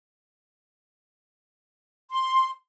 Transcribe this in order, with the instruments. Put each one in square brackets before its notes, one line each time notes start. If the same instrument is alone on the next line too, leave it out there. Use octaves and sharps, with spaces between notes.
[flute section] C6